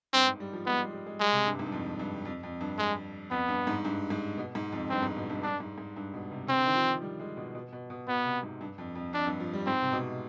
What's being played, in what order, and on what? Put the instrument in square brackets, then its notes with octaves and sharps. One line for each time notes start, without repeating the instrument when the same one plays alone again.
[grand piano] G2 [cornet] C4
[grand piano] G#2
G3
F3
[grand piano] G#3 [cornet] B3
[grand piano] G3
G3
G#3
[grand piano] G3 [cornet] G#3
[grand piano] C3
G2
G#2
G2
F2
G2
F2
F2
G2
[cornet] G#3
[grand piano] F2 [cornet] B3
[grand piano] G2
G#2
G2
G#2
B2
G#2
F2
[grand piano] G2 [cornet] C4
[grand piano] G#2
B2
G2
[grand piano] G2 [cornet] D4
[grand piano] G#2
G#2
G2
B2
C3
[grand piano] C3 [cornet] C4
[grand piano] D3
D#3
F3
G3
G#3
B2
B2
B2
B2
[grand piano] B2 [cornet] B3
[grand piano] C3
G#2
G2
F2
F2
[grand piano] F2 [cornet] D4
[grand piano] G2
F3
G3
[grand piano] G#2 [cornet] C4
[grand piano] C3
B2